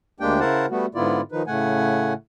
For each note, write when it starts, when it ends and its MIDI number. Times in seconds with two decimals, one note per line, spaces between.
0.20 0.40 38
0.20 0.40 56
0.20 0.40 58
0.20 0.40 62
0.20 0.40 67
0.20 0.40 79
0.40 0.66 49
0.40 0.66 64
0.40 0.66 70
0.40 0.66 72
0.40 0.66 78
0.40 0.66 81
0.70 0.86 55
0.70 0.86 57
0.70 0.86 59
0.70 0.86 66
0.95 1.21 44
0.95 1.21 50
0.95 1.21 59
0.95 1.21 64
0.95 1.21 65
0.95 1.21 74
1.32 1.43 51
1.32 1.43 53
1.32 1.43 63
1.32 1.43 71
1.47 2.13 45
1.47 2.13 49
1.47 2.13 57
1.47 2.13 78
1.47 2.13 80